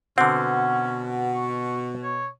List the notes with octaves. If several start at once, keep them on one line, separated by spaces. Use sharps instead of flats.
B2 D3 C4 C#4 F#5
C#6
C#5